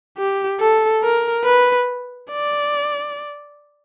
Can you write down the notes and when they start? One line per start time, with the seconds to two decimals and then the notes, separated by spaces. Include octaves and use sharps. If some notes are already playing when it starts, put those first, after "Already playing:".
0.18 G4
0.60 A4
1.03 A#4
1.45 B4
2.31 D5